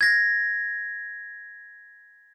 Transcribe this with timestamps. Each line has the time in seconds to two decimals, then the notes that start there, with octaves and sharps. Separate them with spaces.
0.01 G#6 A#6